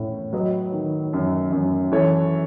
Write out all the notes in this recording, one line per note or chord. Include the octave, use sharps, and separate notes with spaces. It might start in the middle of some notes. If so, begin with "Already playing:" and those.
Already playing: A2 C#4
F#3 B4 D#5
D#3
F#2
F#2
E3 A4 C#5